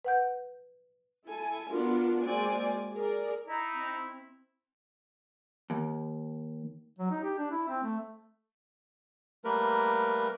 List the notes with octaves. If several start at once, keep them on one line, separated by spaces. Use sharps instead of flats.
B4 F#5 G6
E4 A4 G#5
B3 D4 F4 F#4 A#4
G#3 A#3 C4 F#4 D5 G#5
G#4 A#4 D5
D#4 E4 A#5
C4
D#2
F#3
D#4
G4
D4
E4
C4
A3
G3 A3 A#3 A#4 B4